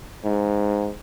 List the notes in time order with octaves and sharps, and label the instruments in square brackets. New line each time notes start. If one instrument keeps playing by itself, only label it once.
[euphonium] G#2